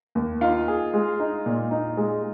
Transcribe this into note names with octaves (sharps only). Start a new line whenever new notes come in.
D#2
D#4 F4 F5
G#4
G#3
D#4
A#2
D#4
G#3